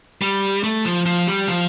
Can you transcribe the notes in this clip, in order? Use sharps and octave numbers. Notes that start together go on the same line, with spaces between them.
G3
A3
F3
F3
G3
F3